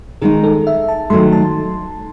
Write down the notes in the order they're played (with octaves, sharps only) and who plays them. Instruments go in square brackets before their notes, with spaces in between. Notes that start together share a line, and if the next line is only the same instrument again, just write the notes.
[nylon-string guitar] D#3 G#3 D#4 [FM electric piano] G#4
[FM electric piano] A4
E5
A5
[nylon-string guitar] D#3 F#3 A3 [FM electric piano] C6
[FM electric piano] A5